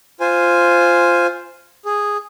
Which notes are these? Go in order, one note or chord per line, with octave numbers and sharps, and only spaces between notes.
F4 C5 G#5
G#4